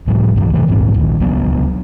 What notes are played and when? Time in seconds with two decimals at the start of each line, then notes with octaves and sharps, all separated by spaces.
0.07 C#2 A2 F3 G3
0.36 C#2 G2 E3 F#3
0.53 C3 D#3 E3 A3
0.68 D#1 A#1 G#2 C4
0.94 D#1 A#1 D#2
1.20 C#2 F#3 B3 D4